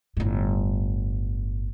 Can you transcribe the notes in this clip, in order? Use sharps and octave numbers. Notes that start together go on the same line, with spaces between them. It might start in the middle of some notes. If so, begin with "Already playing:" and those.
G1 A2